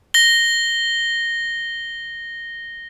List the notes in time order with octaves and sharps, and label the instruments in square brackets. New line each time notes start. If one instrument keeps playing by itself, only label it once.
[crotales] A#6 G7